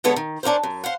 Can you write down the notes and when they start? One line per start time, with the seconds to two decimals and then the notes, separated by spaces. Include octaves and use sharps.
0.04 D3 G#3 B3 A4 B4 C#5
0.16 D#3
0.43 C#4 D4 F#4 A#4 C5
0.63 F#2
0.84 C5 F5 F#5